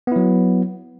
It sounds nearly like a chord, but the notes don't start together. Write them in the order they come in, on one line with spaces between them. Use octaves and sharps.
B3 E4 F#3